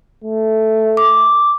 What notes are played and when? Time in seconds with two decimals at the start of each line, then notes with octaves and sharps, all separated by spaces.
0.24 A3
0.97 D6